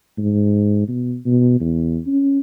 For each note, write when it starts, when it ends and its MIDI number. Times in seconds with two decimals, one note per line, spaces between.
0.18 0.84 44
0.88 1.16 47
1.26 1.59 47
1.60 1.99 40
2.06 2.39 61